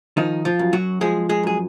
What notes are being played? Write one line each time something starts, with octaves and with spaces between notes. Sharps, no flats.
D#3 F3 D#4
F3 F4
F#2
F#3 F#4
F3 G#3 G#4
G#3 G#4
F#2 G#4